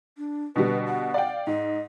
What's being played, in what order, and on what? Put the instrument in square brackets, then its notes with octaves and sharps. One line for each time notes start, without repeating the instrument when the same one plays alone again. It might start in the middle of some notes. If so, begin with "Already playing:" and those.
[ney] D4
[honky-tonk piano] B2 D3 G3 [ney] B4
[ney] F#5
[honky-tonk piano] D5 F5 G5
[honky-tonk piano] G#2 [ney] D#5